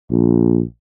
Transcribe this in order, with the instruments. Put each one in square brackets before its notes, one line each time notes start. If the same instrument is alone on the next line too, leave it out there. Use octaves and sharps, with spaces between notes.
[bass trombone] A#1